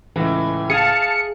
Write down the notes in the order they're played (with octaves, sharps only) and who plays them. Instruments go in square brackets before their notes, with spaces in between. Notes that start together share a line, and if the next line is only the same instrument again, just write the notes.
[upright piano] C#2 A2 [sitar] E3
[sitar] G#4 [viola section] F5 A5 [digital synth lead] C#7